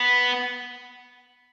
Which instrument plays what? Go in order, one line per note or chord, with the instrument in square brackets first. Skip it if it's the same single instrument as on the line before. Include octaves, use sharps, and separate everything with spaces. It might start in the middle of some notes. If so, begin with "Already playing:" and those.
Already playing: [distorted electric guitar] B3